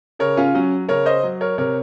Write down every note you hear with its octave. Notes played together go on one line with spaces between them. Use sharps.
C#3 A#4 C#5
C#4 F4
F#3 C#4
C#3 A#4 C#5
C5 D#5
F#3
A#4 C#5
C3 A#4 C#5